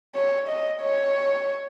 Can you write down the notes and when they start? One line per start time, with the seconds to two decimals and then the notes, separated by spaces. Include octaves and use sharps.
0.15 C#5
0.48 D#5
0.82 C#5